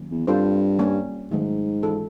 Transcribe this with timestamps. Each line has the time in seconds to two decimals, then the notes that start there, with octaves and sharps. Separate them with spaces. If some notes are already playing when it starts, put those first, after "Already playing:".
Already playing: D#3 F#3 A#3 C#4
0.11 E2
0.27 G2 C4 F4 A4 C5
0.79 G3 A#3 C#4
1.31 G#2 D#3 F#3 A3
1.82 E3 G#3 C#4 F4 A4